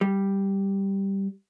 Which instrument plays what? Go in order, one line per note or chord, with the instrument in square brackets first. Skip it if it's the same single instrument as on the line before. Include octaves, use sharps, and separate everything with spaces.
[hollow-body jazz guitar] G3